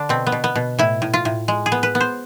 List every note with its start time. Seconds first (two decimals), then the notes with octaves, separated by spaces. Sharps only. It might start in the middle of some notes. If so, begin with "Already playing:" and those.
Already playing: D3 D4
0.09 B2 C4
0.27 B3
0.32 B2
0.44 B3
0.55 B2
0.79 A2 E4
1.02 A2
1.14 F4
1.25 A2
1.48 G#3
1.66 G#4
1.72 B3
1.83 B4
1.95 B3
2.01 C5